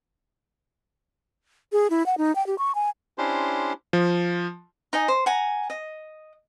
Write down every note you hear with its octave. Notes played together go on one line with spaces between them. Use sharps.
G#4
E4
F#5
D#4
G5
G4
C#6
G#5
C#4 D4 E4 G4 C5 C6
F3
D#4 D#5 G#5
C5
F#5 G#5 A#5
D#5